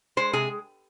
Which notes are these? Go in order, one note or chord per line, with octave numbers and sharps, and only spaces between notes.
G#3 C5
C3 G#4